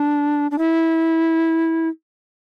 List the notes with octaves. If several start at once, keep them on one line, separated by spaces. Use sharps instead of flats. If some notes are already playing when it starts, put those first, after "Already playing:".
Already playing: D4
D4
E4